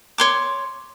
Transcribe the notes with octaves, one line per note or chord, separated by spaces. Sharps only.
C#5 C6 D6